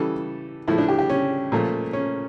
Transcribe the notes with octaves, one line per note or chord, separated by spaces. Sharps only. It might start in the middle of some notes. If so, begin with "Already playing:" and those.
Already playing: C#3 E3 G3 A4
A2 F3 A3 E4
D4
G4
G4
C#4
A#2 F3 A3
C#4